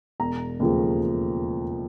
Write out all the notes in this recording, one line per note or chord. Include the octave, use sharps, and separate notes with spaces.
E1 A#5
D#2 C#3 F3 A3